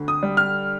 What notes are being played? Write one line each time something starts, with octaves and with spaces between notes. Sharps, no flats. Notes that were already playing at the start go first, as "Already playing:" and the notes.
Already playing: D2 D3
D#6
G3
F6